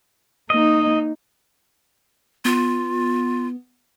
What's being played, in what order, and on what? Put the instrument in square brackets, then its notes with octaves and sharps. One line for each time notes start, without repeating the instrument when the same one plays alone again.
[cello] A#3 D#4 [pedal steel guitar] D#5
[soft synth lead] B3 [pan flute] F4